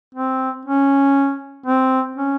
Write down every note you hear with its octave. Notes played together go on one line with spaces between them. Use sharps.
C4
C#4
C4
C#4